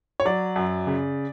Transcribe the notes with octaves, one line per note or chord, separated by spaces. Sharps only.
C#5
F#3 D5
F#2
C#3